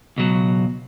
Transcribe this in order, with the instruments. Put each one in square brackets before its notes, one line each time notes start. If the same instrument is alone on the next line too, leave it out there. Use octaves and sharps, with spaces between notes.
[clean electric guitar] C#2 B2 F#3